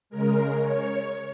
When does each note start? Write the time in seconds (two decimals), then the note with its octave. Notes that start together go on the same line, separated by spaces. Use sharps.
0.10 C#3 G#3 A#4
0.60 C#5